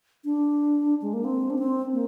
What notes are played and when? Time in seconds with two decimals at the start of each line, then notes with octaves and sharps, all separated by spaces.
0.25 D4
1.02 G#3
1.13 A#3
1.24 C4
1.50 D4
1.59 C4
1.92 A#3